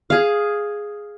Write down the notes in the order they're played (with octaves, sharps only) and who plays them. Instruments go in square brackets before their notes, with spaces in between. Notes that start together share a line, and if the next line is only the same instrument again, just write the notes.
[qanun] G#4 F5